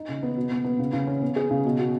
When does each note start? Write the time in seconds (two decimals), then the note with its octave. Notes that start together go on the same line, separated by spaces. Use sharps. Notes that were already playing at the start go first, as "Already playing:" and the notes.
Already playing: D#4
0.09 C#3
0.23 B3
0.37 B2
0.51 B3
0.64 B3
0.79 C#3
0.93 C#3
1.07 C#4
1.22 B3
1.36 G#4
1.51 C#3
1.65 B2
1.79 F#4